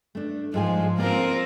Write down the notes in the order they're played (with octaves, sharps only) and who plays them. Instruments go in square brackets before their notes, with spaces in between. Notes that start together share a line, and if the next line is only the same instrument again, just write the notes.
[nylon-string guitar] A3 D4
[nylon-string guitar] G#2 G#3 G#5 [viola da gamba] F3
[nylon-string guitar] A#3 D5 [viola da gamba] C4 F4 A#4